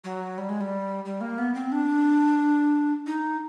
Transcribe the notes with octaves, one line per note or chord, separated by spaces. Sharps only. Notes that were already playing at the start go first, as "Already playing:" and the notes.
F#3
G3
G#3
G3
G3
A#3
B3
C4
D4
D#4